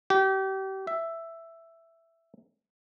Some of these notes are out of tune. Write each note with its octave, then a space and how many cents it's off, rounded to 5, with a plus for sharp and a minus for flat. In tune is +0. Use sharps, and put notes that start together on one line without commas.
G4 -35
E5 +5